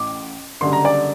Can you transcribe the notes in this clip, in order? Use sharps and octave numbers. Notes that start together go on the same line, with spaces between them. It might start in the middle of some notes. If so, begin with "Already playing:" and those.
Already playing: A1 A2 D6
F#1 F#2 D3 G3 C6
A#5
D5